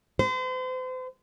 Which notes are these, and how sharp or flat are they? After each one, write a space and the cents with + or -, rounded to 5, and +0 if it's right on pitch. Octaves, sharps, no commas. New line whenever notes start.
C5 -40